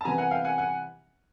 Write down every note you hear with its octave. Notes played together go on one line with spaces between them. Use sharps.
A5
C3 E3 G3 B3 G#5 A#5
F#5 G#5
F5 G5
F#5 G#5
F#5 G#5